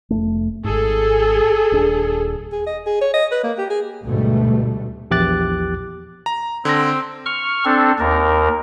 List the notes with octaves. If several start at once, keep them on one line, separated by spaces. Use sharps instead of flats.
F1 F2 A3
G#1 G#2 G#4 A4
D#1 D4
G#4
D#5
G#4
C#5
D#5
B4
A#3
G4
G#4
D2 G#2 B2 G3 A3
A#1 E2 G4 D6 F#6 A6
A#5
D3 C4 A#6
C#6 F6
C4 D4 A4
D#2 A#4